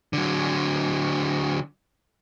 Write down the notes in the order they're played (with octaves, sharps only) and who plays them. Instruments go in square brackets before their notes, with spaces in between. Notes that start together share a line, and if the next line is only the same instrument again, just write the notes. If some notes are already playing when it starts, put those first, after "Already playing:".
[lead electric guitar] D3 F#3